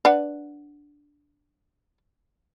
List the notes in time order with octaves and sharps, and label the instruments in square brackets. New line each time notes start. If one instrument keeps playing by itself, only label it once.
[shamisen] D4 B4 F#5